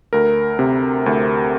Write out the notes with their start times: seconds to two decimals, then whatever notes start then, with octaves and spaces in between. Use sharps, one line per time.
0.13 D2 A#4
0.59 C3
1.06 D2